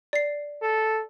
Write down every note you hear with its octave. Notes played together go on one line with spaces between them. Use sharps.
D5 C7
A4